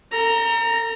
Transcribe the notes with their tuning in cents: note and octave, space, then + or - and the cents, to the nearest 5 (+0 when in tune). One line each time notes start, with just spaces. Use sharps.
A4 +45 A#5 +0